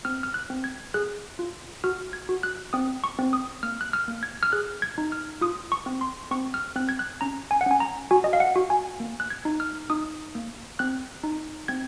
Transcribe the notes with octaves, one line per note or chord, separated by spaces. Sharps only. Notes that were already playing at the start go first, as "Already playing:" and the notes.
C4 F6
F6
F#6
C4
G#6
G#4 F#6
F4
F#4 F6
G#6
F#4
F#6
C4 D#6
C#6
C4
D#6
A#3 F6
F#6
F6
A#3
G#6
F6
G#4 F#6
G#6
D#4
F6
F4 D#6
C#6
C4
C6
C4 C#6
F6
C4 F#6
G#6
F#6
C#4 A#5
G#5
F#5
C#4 G#5
A#5
F#4 G#5
D#5
F5
F#5
F#4
G#5
A#3
F#6
G#6
D#4
F6
D#4 D#6
A#3
C4 F#6
D#4
C4 G#6